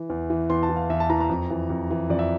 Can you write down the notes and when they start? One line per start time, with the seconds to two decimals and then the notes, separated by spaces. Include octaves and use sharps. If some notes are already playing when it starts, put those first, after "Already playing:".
Already playing: E3
0.10 E2
0.30 E3
0.50 E2 C6
0.63 A5
0.69 E3
0.76 F5
0.90 E2 E5
1.00 A5
1.10 E3 A#5
1.20 A#5
1.29 F2
1.50 E3
1.70 F2
1.91 E3
2.10 F2 D5
2.19 E5